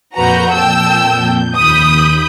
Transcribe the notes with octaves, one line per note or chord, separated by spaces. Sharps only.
F2 A#2 F#4 B4 A#5 G6
G5 A5 E6
D#2 B5 D#6 G6